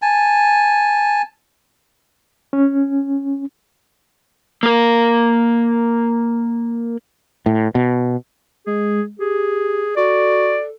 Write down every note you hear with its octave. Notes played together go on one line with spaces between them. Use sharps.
G#5 A5
C#4
A#3 A#4
A2
B2
G#3 G#4
G4 G#4
F#4 A4 D5